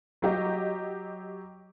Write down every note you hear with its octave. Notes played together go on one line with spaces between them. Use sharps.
F#3 G4 D#5